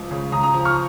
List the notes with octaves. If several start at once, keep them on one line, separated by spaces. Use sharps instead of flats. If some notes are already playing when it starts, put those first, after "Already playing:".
Already playing: C#2 F3
C#3
C#3 A#5 D#6
A#5 D#6
F3
C#6 F6